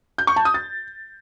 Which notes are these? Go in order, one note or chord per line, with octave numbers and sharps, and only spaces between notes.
G6
C#6
A5
D#6
A6